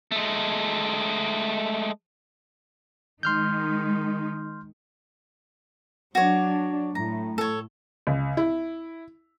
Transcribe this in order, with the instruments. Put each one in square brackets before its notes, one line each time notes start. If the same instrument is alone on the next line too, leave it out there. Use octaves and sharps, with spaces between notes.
[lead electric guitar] G#3 A3
[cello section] D#3 G#3 D#4 [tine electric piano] C6 F6 G6
[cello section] F#3 D4 [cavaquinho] F#4 C#5
[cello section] A2 [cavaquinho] A#5
[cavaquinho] A4 C#5
[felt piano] C#2
E4